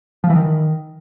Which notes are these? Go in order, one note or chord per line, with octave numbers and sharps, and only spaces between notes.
F3
E3
D#3